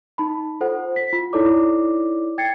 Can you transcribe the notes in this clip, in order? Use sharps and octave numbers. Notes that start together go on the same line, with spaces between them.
D#4 A5 B5
F4 A4 C5 F#5
B6
F4
D#4 E4 A4 C#5 D5 D6
G5 G#6 A6 C7 C#7